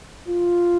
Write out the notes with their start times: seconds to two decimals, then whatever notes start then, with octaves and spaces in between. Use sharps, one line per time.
0.28 F4